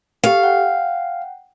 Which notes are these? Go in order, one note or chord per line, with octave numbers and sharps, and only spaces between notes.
G4 A4 F5
F#5 G5